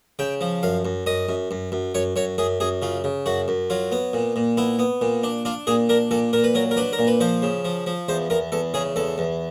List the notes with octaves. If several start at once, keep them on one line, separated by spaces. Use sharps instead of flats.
C#3 G5
F3
F#2 F5
F#2
F#2 D#5
F#2
F#2
F#2
F#2 C#5
F#2 C#5
F#2 G#4
F#2 G#4
C#3 F4
C#3
F#2 F#4
F#2
F#3 F4
B3
A#2
A#2
B3 E4
B3
A#2
D4
D4 F4
A#2 G#4
D4 A#4
A#2 A4
A#2 A#4
B4
F#3 A#4
A#4
D4 B4
A#4
A#2
B4
F3 C5
C#3
F3
F3
E2 C5
E2 A#4
E2 A4
C#3 G#4
E2 A4
E2